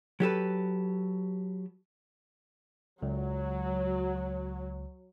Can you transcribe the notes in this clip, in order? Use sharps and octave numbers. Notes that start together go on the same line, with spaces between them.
F#3 G4 A4 B4
C#2 F#3